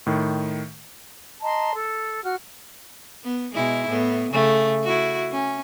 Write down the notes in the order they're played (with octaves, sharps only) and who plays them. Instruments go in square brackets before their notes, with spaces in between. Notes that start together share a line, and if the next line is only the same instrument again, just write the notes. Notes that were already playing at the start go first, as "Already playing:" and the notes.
[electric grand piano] A2 D#3
[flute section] D#5 A5 A#5 C6
A4
F#4 F6
[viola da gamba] B3
B2 G#3 E4
A2 B3
C#3 A3
E4 F#4
C#4